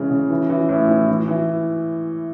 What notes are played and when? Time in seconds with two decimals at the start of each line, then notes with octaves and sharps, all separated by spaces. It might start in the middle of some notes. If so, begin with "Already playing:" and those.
Already playing: C#3 E3 G#3
0.11 C#3
0.30 E3
0.49 E3
0.69 A2
0.88 E3
1.08 E3
1.28 E3